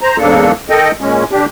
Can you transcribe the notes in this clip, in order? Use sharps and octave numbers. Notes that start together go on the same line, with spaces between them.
C5 A#5
E2 G#2 C#3 A#3 D4 A4
D#3 A4 D#5 G5
A#2 G#3 C#4
D3 D4 G4